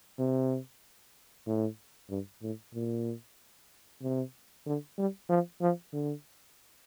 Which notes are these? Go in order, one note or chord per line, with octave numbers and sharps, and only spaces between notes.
C3
A2
G2
A2
A#2
C3
D3
G3
F3
F3
D3